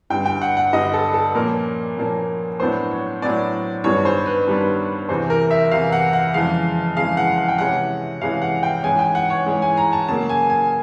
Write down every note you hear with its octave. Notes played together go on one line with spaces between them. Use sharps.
G2 D3 G3 G5
G5
F#5
F#5
G2 D3 G3 D#5
A4
A4
A#2 F3 A#3 C#4 A#4
A#2 F3 A#3 C#4
A2 F#3 B3 D4 C5
C#5
A2 F#3 B3 D4 D5
G2 D#3 G3 B3 D4 C#5
C5
B4
G2 D#3 G3 B3 D4
E2 C3 E3 C5
A#4
E5
E2 C3 E3 F5
F#5
F#5
F2 C#3 E3 G#3 F5
F2 C#3 E3 G#3 F5
F#5
F#5
G5
C3 E3 G#3 C#4 F#5
C3 E3 G#3 C#4 F5
F#5
G5
G#2 E3 G#3 C#4 G#5
G5
F#5
C#5
G#2 E3 G#3 C#4
G#5
A#5
A5
C#3 F#3 A#3 A5
G#5
G#5